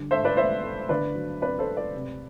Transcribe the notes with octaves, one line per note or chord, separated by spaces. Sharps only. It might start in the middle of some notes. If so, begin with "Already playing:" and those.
Already playing: D3 G3
A3 C5 E5
B4 D5
A3 C5 E5
A3
D3 B4 D5
F#3
C4 B4 D5
A4 C5
A3
B4 D5
C3